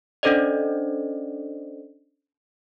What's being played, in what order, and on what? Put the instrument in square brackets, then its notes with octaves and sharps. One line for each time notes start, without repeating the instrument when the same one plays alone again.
[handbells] C#4 D4 A4 C5 D5 D#5